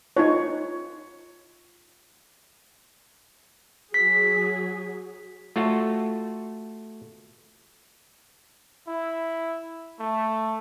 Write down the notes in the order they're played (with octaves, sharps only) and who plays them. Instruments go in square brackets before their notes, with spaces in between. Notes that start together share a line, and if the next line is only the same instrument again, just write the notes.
[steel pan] D#4 F4 C#5
[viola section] F#3 G#4 [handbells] B6
[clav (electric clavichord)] A3 F4 F#4
[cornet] E4
A3